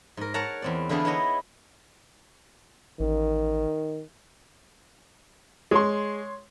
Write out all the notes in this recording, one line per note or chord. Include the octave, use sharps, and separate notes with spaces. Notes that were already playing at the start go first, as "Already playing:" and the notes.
G#2 A#4
A#4 C#5 F#5 A5 A#5
E2 C4 D5
D3 E3 B3 D4 G#4 F5
B3 D#4 E4 C#5 D#5
A1 D#3
G#3 C#5 C6